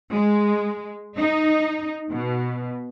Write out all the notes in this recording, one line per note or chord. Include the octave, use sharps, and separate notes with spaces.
G#3
D#4
B2